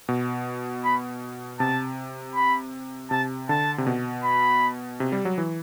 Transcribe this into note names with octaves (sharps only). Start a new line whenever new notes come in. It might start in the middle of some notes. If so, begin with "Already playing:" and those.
B2
B5
C3 A5
B5
C3 A5
D3 A5
C3
B2
B5
C3
G3
F#3
E3